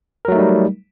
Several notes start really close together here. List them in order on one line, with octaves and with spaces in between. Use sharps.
A#4 F#3 A3 D#4 G3